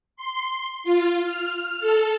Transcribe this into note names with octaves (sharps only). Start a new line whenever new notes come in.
C6
F4
F6
A4